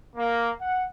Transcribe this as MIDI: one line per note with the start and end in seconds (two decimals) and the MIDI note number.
0.16 0.48 58
0.59 0.85 78